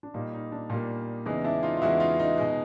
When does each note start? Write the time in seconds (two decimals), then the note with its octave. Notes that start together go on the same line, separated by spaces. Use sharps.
0.03 D4
0.14 A#2 G3 A#3 D#4
0.33 D#4
0.52 D4
0.70 A#2 G3 A#3
1.26 E2 C#3 E3 G#3 D#4
1.44 D4 E4
1.63 D#4 F4
1.77 F4
1.81 E2 C#3 E3 G#3 E4 F#4
2.00 D#4 F4
2.20 D#4
2.38 B2 G#3